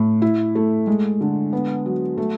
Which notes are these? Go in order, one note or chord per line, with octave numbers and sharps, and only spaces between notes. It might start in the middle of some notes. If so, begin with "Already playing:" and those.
Already playing: A2
E4
A3
G#3
D3
B3
F#3
A3